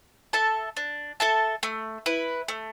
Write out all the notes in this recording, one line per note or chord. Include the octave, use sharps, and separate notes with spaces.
A4 E5 A5
D4
A4 E5 A5
A3
E4 B4
A3